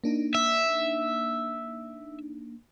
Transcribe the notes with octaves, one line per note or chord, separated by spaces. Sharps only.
A#3 D4 D#4
E5